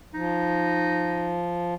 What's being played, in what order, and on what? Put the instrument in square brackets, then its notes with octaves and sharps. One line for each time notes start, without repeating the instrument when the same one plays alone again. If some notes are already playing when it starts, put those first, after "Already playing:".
[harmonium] F3 [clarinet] D#4